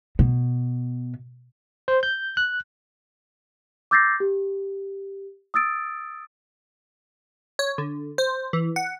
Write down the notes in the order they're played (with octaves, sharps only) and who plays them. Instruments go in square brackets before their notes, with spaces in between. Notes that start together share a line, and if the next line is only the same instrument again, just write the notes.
[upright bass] B2
[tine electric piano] C5
G6
F#6
[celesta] D6 E6 G6 A6 A#6 C7
G4
D#6 E6 A6 D7
[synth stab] C#5
D3
C5
E3
F#5